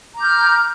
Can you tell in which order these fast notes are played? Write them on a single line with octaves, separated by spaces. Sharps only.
A#5 D6 G6 F6